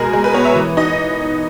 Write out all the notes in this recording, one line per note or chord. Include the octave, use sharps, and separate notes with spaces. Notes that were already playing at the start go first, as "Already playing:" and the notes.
Already playing: B2 G#3 G#4 A#4
G#3 G#4
B4
B3 C#5
E5
E3
D#4 D#5